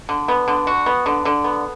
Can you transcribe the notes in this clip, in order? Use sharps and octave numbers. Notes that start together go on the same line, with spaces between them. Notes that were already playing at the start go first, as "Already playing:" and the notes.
D3
B3
D3
F#4
B3
D3
D3
B3